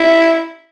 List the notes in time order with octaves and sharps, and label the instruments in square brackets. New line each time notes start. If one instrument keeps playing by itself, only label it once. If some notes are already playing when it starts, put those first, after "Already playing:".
Already playing: [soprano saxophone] E4